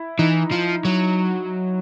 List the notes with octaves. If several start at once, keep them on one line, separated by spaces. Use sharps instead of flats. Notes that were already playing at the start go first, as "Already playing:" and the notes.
Already playing: E4
E3 D#4
F3
F#3